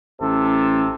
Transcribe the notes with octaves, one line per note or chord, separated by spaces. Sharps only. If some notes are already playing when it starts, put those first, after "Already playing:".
A1 C3 A4